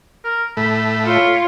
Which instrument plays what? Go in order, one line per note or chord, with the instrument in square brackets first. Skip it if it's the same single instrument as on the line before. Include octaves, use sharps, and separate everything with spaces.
[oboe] A#4
[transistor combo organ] A2 A3 [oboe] B5
[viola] F4 C#5